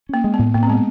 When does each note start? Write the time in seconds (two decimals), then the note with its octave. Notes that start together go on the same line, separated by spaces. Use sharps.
0.09 A#3 C#4
0.24 G#3
0.34 B3
0.39 A2
0.54 A2 A#3
0.63 C4
0.69 G#3 B3